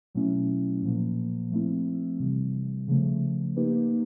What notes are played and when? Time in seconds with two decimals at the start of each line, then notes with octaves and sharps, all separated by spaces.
0.15 B2 F#3 A3 C#4 E4
0.83 A#2 F3 A#3
1.51 F3 A3 C4 E4
2.20 C3 E3 G3
2.88 C#3 F3 A3
3.56 A#3 D#4 G4 B4